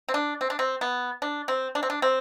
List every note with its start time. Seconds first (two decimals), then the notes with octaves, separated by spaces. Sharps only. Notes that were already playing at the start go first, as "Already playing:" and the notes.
0.09 C4
0.14 D4
0.41 C4
0.50 D4
0.59 C4
0.81 B3
1.22 D4
1.48 C4
1.75 D4
1.83 C4
1.90 D4
2.02 C4